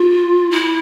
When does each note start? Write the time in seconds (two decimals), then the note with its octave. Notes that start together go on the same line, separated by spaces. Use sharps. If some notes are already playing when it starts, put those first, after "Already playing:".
Already playing: F4
0.51 E4